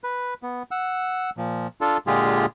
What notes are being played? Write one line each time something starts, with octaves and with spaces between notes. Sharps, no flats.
B4
B3
F#5 E6
A#2 F3
D4 F4 A4
A#2 D3 G#3 F4 G4 G#4